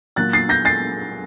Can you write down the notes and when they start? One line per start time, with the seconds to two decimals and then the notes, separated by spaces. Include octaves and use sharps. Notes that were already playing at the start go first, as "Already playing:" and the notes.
0.16 A#2 F#3 A#3 F#6 A6
0.33 A6 C7
0.49 G6 A#6
0.65 A6 C7